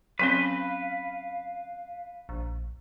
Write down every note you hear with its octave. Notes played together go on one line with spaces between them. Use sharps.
F#3 C4 C#4 B4 F5
A#1